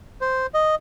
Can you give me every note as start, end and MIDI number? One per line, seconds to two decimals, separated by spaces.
0.21 0.46 72
0.54 0.75 75